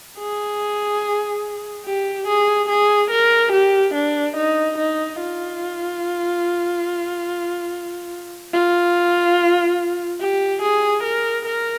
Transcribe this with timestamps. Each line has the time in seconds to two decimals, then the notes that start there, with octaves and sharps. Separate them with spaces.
0.18 G#4
1.86 G4
2.27 G#4
2.69 G#4
3.11 A#4
3.52 G4
3.94 D4
4.36 D#4
4.78 D#4
5.20 F4
8.53 F4
10.20 G4
10.62 G#4
11.04 A#4
11.46 A#4